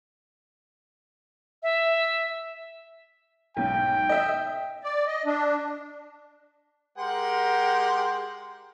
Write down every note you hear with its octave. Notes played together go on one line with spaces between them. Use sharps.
E5
B1 G#2 G5
D#5 E5
D5
D#5
D4
G#3 G4 A#4 F#5 G5 C6